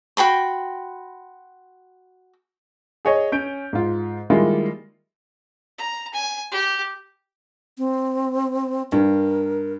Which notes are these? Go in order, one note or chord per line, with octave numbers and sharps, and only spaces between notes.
F#4 G5 B5 C6
G#4 C#5 D#5
C#4 G6 D7
G#2 F4
D#3 G3 G#3 A#3 E4 F4
A#5
G#5
G4
C4
G2 A#4